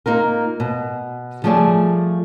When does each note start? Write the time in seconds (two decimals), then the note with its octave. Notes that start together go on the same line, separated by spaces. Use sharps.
0.06 A#3 D#4 F4 A#4
0.60 B2
1.44 F3 G3 A3 G#4 D5 E5